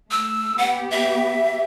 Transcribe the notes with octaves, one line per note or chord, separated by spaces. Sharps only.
A3 E6
B3 G4 F#5
E5